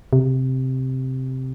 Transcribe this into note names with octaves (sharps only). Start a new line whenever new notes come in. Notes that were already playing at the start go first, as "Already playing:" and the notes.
C3